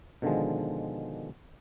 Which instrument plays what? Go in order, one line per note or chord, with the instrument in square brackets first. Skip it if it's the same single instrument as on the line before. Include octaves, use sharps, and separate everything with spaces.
[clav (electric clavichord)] B2 D3 D#3 F3 G#3